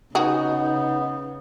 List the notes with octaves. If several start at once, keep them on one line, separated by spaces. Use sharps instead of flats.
C#3 B3 D#4 F#4 G#4